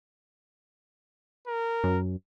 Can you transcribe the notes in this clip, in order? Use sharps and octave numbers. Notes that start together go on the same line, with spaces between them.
A#4
F#2